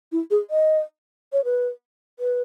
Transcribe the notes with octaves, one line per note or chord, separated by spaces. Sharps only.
E4
G#4
D#5
C#5
B4
B4